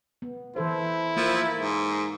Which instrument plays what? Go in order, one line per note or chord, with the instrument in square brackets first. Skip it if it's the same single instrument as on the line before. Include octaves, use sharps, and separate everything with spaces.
[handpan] B3
[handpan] E3 A4 C5 [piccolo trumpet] E4
[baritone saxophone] F3 [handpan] A#3
[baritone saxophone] G#2